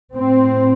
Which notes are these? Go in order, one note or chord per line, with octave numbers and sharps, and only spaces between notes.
A2 C4